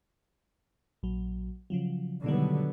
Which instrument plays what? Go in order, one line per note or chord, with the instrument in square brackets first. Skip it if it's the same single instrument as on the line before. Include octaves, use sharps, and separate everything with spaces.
[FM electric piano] A#1 F#3
C#3 F3 F#3
[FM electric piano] B2 D#3 G3 [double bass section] D3 F#3 B3